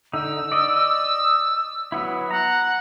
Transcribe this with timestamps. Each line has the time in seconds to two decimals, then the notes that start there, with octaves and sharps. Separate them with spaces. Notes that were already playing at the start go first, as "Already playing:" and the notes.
0.13 D3 D#4 E6
0.52 D5 D#5
1.92 F#3 B3 E4
2.31 F#5 A#5